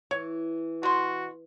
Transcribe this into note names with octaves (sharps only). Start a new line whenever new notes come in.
E3 C#5
B2 F#4 C6